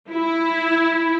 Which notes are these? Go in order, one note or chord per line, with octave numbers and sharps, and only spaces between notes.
E4